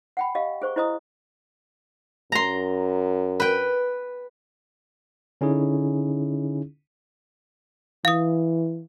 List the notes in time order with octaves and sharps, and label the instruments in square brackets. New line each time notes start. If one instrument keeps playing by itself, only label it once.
[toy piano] F#5 G5 B5
G4 D#5 F5
G#4 C5 C#6
E4 C5 D#5 A#5 D#6
[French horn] F#2 [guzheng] A#5 C6
[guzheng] B4 G5
[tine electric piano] D3 C#4 D#4 E4 G#4
[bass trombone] E3 [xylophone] F5 D#6